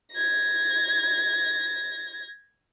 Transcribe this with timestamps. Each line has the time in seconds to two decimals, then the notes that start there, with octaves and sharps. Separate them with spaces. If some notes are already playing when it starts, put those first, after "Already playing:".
0.12 G#6 A#6